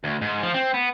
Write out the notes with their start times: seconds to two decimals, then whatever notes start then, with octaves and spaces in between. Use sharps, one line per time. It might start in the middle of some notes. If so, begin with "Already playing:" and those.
0.04 D2
0.22 G#2
0.43 F3
0.54 C4
0.74 B3